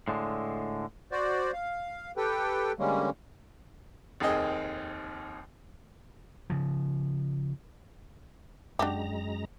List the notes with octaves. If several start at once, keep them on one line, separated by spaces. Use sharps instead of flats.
A2 D3 G#3
F#4 C5 D5
F5
G4 A4 B4 G5
D3 G3 G#3 A#3 C#4
F1 D#2 D#3 C4 G#4 D#5
C#3 F3
F#2 G#3 D4 F#4 G4 A#5